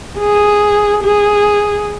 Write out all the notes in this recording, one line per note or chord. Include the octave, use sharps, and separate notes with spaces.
G#4
G#4